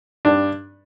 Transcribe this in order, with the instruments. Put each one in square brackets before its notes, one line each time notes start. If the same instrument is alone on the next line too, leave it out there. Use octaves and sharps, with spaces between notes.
[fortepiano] G2 D4